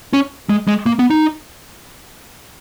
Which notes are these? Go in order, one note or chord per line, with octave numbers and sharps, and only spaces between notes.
C#4
G#3
G#3
A#3
B3
D#4